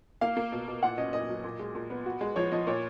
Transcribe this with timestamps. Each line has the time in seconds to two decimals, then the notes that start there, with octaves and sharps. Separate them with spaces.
0.21 A#3 F5
0.37 A#3
0.52 B2
0.68 B2
0.83 A#2 F#5
0.98 C#4 D#5
1.13 A#2 D#5
1.30 F#3
1.44 A#2
1.59 G#3
1.75 A#2
1.90 B3
2.06 F#4
2.21 G#3
2.36 F3 C#5
2.52 F3 D#5
2.67 A#2 C#5